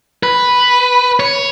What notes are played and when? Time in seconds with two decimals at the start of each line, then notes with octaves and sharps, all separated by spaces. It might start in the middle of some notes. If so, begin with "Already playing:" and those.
0.23 B4
1.20 C#5